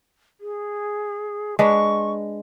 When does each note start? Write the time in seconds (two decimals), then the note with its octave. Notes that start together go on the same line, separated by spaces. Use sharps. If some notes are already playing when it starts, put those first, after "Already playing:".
0.40 G#4
1.59 G#3 D4 B4 C#6